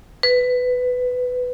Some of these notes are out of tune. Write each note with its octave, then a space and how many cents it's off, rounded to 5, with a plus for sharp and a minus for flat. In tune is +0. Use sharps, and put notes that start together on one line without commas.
B4 +15